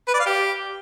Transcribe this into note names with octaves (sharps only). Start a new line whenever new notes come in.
B4
D5
F5
G4